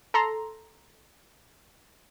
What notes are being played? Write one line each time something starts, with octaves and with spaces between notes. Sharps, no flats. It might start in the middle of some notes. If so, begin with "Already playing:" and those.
A4 A#5 C6